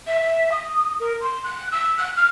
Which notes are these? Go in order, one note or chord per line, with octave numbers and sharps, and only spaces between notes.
E5
E5
D#6
A#4
C6
F#6
E6
F#6
F6